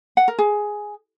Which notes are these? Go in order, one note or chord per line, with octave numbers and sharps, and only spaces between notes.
F#5
A#4
G#4